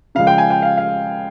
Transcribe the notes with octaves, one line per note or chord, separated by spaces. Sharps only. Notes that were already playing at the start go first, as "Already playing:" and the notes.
C#3 F3 G#3 F5
G5
G#5
G5
F5
F5